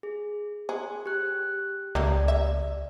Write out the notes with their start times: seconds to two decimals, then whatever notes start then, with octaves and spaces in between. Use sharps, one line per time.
0.03 G#4
0.69 G#4 C5
1.06 G4 F#6
1.95 C#2 A3 A#3 G4 D5
2.28 E5